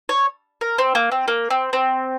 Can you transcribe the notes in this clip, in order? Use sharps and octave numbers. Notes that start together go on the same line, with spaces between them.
C#5
A#4
C4
A#3
C4
A#3
C4
C4